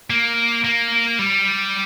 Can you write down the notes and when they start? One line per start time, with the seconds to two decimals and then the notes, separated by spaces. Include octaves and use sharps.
0.10 A#3
0.64 A#3
1.19 G3